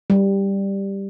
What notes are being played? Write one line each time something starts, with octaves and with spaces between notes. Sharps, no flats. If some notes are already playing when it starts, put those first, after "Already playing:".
G3